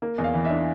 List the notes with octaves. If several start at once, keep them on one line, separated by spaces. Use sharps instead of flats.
A#3
E2
F5
E3
E5
D4